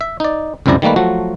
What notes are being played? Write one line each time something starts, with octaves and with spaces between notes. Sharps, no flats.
E5
D#4 D5
C#2 F#2 C3 E4 D5 A#5
D#3 G3 A3 A#3 B4
F3 F#3 A3 F#4